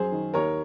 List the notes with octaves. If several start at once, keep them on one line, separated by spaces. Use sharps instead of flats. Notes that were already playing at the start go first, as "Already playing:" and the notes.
Already playing: F#2 G#4 C5
D#3
D#2 A#4 C#5